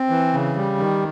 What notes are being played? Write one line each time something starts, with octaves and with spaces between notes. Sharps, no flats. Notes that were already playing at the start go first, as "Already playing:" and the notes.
Already playing: C4
E3
C#3
G3
D#3